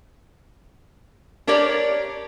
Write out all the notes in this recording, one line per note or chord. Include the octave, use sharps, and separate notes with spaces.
D4 G4 A#4 C#5 D5